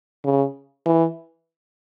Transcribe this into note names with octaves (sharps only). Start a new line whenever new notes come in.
C#3
E3